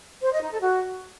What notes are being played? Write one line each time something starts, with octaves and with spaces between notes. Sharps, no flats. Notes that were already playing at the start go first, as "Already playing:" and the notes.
C5
D#5
D#4
A4
F#4